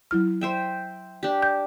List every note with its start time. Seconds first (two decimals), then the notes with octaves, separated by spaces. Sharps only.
0.11 F#3 E4 F6
0.41 C5 E5 G5
1.23 D4 G4
1.42 G6